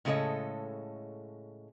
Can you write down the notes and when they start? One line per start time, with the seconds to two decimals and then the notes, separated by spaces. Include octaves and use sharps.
0.05 A2 C#3 G#3 A4 C#5 D#5